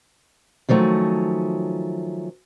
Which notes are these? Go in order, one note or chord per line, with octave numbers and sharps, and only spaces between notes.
D#3 F3 F#3 A3 C#4